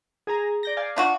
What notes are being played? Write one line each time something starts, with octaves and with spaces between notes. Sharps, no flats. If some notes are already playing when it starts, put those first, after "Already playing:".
G#4 G#5 A#5
D5 G6 A#6
D5 F5 G#5
D4 F4 F#4